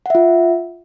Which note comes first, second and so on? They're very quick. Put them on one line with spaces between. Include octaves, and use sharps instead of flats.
F#5 E5 F4